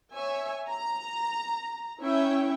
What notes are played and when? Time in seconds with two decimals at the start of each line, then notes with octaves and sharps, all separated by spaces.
0.14 C#5 E5 G#5
0.69 A#5
2.01 C#4 E4 C#5 E5 G5